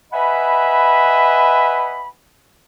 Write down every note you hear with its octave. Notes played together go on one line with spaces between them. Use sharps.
B4 D#5 E5 F#5 G#5 B5